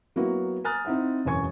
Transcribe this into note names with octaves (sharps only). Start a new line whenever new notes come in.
F#3 A#3 B3 E4 F#4
G#5 A#5 D#6 F6 F#6 A6
C4 D#4 E4 E5 F#5
E1 F#2 E3 G#5 C#6 G#6